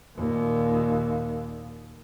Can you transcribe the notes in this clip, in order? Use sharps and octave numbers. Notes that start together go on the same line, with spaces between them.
D#2 A#2